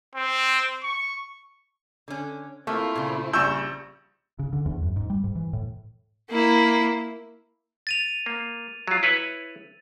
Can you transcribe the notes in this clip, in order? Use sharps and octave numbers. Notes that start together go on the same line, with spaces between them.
C4
C#6
D3 C#4
A3 A#3 C4 E4 F4
A#2 C#3
A#1 C#3 G3 C#6 E6 G6 E7
C#3
D3
E2
F#2
G#2
G3
G#2
E3
A2
A#3 E4
A6 D#7 F7
A#3
F#3 F4
E4 B4 C#5